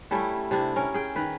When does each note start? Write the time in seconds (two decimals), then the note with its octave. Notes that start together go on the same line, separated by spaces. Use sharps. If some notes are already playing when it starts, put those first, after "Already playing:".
0.11 G3 A3 C#4 E4
0.51 C3 D4 E4
0.76 C#4 A#4
0.94 G#4 G5
1.16 D#3 B4